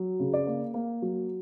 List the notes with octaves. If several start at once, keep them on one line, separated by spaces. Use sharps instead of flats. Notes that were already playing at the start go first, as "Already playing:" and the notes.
Already playing: F#3
C#3
D5
A#3
A#3
F#3